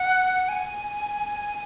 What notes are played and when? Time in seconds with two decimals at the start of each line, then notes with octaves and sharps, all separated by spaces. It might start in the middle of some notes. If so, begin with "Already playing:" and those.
Already playing: F#5
0.49 G#5